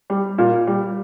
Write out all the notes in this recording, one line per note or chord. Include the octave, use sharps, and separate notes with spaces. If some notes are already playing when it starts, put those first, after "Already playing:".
G3
A#2
G3